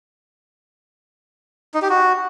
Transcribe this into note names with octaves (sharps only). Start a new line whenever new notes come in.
D#4
G4
F#4